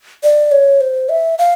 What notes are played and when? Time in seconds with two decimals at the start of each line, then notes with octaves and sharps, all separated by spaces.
0.23 D5
0.52 C#5
0.81 C5
1.09 E5
1.38 F5